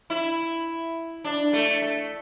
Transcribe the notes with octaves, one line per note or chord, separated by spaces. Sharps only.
E4
D4
A3
A3